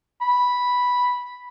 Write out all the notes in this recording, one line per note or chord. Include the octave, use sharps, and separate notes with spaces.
B5